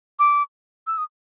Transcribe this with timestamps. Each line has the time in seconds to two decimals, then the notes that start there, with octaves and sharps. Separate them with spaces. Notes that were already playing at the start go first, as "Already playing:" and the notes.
0.19 D6
0.87 E6
0.98 D#6